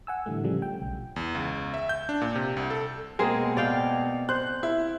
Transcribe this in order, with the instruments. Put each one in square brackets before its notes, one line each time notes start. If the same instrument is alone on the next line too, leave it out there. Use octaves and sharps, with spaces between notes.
[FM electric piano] F#5 G#5 E6
A2 D3 E3 G3 A3
C#3 F3 G3 A3
G5
B1
[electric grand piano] E2
C#2
E5
G6
D4
A#2
C3
C2
A4
[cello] B2 [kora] G#3 C4 [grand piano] A#3 G#4 A#4
[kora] D5 F5 G5
[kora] C5 [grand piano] F#6
[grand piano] E4